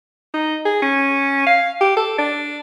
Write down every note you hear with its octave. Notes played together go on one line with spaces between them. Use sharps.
D#4
G#4
C#4
F5
G4
A4
D4